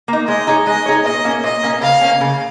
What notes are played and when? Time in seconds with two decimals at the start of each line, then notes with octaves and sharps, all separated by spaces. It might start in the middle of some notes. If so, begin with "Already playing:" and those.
0.08 A#3 D#4
0.28 G#3 D#5
0.47 D#4 G#4 C#5
0.66 G#3 D#5
0.86 D#4 G#4 C#5
1.05 A#2 D#5
1.25 A#3 C#4
1.44 A#2 D#5
1.63 A#3 C#4
1.81 C#3 F5
2.01 A#3 C#4
2.21 C#3